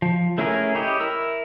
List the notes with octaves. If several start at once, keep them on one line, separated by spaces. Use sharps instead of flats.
F3
A3 C#4 E4 G#4 A#4
E4 G4 C#5 D#5
E4 A#4 E6